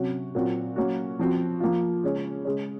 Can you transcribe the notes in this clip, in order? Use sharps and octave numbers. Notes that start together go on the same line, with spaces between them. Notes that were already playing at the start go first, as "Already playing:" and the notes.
Already playing: C3 F#3 C#4 F#4
A#2 F#3 C4 F#4
F#3 A#3 C#4 F#4
F3 C4 F#4
F3 A#3 F4
C#3 G#3 C#4
C#3 G#3 C#4